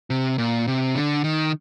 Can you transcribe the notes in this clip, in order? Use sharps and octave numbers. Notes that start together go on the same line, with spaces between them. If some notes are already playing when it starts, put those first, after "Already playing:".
C3
A#2
C3
D3
D#3